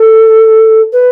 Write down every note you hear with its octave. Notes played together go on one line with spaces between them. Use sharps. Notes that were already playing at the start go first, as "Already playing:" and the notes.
Already playing: A4
B4